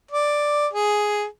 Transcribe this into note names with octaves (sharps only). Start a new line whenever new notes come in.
D5
G#4